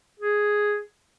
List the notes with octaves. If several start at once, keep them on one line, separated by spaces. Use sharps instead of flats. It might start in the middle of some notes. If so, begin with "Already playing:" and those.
G#4